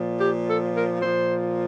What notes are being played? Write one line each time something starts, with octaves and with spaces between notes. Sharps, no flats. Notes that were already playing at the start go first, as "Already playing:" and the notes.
Already playing: A#2 F3
G4
A4
A#4
A#2 F3 C5